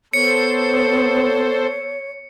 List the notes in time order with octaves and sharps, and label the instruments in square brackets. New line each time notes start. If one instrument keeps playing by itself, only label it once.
[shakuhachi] B3 [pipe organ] A4 C5 [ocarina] C#5 [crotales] C#7